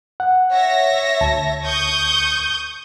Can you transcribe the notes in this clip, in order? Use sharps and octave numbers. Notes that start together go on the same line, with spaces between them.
F#5
C#5 E5 A#6
D2 A5
C#6 D#6 G6